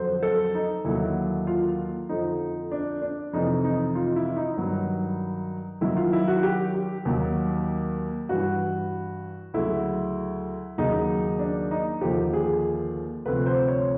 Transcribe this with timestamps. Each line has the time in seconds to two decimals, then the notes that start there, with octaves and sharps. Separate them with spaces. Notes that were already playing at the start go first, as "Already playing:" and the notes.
Already playing: F2 D3 F#3 C5
0.23 A4
0.55 D#4
0.85 D#2 D3 F#3 E4
1.47 F4
2.09 F2 D3 F3 D#4
2.72 D4
3.02 D4
3.33 F2 C3 E3 D#4
3.64 D#4
3.95 F4
4.16 E4
4.37 D#4
4.57 G2 D#3 F#3
5.81 F#2 D#3 F#3 E4
5.97 F4
6.13 E4
6.28 F#4
6.43 G4
6.74 G4
7.05 D#2 D#3 F#3
8.29 G2 E3 F#4
9.54 D2 C#3 F#3 E4
10.78 D#2 C#3 F#3 D#4
11.39 D4
11.71 D#4
12.01 D#2 D3 F3 G4
12.33 G#4
13.25 D2 C3 F3 B4
13.46 C5
13.68 C#5